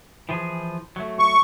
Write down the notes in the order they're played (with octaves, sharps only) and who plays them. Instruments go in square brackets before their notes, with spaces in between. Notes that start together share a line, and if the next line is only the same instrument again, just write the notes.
[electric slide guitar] E3 F3 G#4
F#3 A3
[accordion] C#6